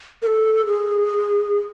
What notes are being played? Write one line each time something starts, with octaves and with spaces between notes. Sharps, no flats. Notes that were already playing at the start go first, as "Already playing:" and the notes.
A#4
A4
G#4